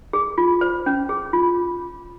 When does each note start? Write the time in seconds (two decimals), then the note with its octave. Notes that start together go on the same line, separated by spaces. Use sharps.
0.13 G#4
0.38 F4
0.61 C5
0.86 C#4
1.09 G#4
1.33 F4